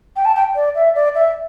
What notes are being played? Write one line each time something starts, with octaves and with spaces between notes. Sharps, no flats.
G5
A5
G5
D5
E5
D5
E5